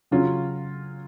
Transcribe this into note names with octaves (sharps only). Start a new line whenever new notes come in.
C#3 F#3 C#4 F4